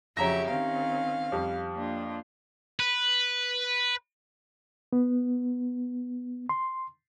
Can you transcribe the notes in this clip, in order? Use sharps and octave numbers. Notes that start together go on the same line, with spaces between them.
F2 C#3 F#3 G4 C#5 E5 A#5 A#6
D#3 C4 C#4 F5
F2 G3
A#3 D4 F4
B4
B3
C6